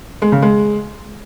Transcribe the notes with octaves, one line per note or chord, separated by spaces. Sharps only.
G#3
C#3
G#3